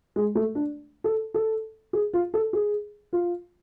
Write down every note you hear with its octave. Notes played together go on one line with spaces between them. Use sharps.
G#3
A3
D4
A4
A4
G#4
F4
A4
G#4
F4